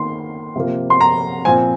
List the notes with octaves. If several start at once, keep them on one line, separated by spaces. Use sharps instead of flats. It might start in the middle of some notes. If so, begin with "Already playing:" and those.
Already playing: D#3 A#3 C6
C3 F3 A#3
C6
A#5
A#2 F3 C4 G#5